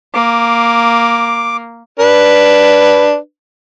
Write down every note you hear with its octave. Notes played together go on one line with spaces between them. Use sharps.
A#3 D6
D4 B4